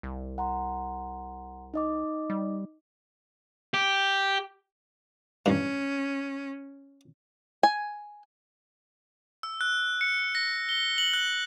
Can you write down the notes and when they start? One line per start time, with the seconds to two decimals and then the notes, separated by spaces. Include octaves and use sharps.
0.03 C2
0.38 F#5 A#5 C6
1.74 D#4 D#5 D6
2.30 G3
3.74 G4
5.46 A1 G2 C#4
7.63 G#5
9.43 E6
9.61 F#6
10.01 C#7
10.35 A#6
10.69 G7
10.98 F#7
11.13 F#6